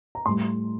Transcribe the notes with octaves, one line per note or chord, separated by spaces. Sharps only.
A#5
A2 G3 C6